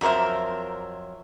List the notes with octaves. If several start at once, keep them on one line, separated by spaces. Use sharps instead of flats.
F2 F#3 A#4 C5 E5